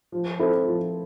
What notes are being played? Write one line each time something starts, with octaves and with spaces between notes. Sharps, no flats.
F3
C4 E4 A4
F3